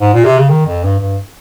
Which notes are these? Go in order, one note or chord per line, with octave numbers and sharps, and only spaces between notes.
G#2
A#2
C3
C#3
D#3
F2
G2
G2